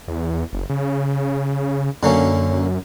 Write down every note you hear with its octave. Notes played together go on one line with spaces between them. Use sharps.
E2
F#1
C#3
F#2 D3 A#3 C#4